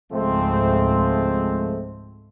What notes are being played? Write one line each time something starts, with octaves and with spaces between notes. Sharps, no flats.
C#2 G#2 F3 G#3 A3 C4